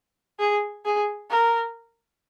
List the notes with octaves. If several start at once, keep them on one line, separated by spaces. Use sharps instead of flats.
G#4
G#4
A#4